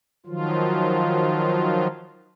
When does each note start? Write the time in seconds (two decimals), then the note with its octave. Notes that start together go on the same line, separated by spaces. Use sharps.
0.26 D#3 F3 F#3 F4